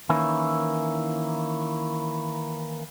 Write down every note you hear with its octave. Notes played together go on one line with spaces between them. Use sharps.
D#3 E3 A#3 C#4 E4